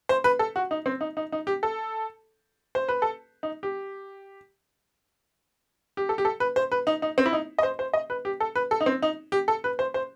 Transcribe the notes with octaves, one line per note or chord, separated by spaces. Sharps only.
C5
B4
A4
F#4
D#4
C4
D#4
D#4
D#4
G4
A4
C5
B4
A4
D#4
G4
G4
A4
G4
A4
B4
C5
B4
D#4
D#4
C4
E4
D#4
D#5
C5
C5
D#5
B4
G4
A4
B4
A4
D#4
C4
D#4
G4
A4
B4
C5
C5